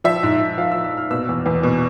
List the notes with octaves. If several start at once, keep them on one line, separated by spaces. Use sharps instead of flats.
F3 E5
G#2
G#2
F3 F5
F3 E6
E6
G#2 F6
B2 E6
E2
E2
B2